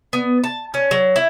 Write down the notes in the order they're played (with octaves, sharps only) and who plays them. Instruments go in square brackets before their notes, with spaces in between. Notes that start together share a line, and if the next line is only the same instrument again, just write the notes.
[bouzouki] B3
A5
C#4
F#3
E4